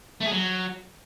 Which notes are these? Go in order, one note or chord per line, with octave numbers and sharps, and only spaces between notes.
A3
G#4
F#3